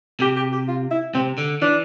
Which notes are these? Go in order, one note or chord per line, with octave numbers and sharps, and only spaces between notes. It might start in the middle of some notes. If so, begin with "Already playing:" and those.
C3 G4
G4
G4
F4
E4
C3 C4
D3
E3 D4